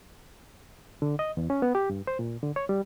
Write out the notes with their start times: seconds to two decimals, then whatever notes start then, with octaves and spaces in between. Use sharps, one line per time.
1.02 D3
1.19 D#5
1.37 E2
1.50 C#4
1.62 B3
1.75 G4
1.90 G2
2.07 C5
2.19 A#2
2.43 D3
2.56 C#5
2.69 G3